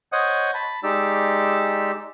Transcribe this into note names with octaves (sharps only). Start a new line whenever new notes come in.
C5 C#5 D#5 F#5 D#6
A5 B5
G#3 D#4 G4 D5 E6